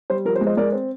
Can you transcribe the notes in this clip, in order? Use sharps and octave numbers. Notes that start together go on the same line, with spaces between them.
G3 C5
F3 A#4
C5
G#3
C5 D#5
G#3 A#4 D5
C4